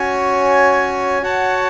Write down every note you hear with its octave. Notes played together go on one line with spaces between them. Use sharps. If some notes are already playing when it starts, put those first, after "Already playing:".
Already playing: C#4 F#4 C#5 G#5
F#4 C#5 F#5 A5